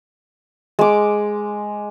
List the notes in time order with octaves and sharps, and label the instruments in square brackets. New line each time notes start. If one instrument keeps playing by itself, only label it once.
[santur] G#3 D6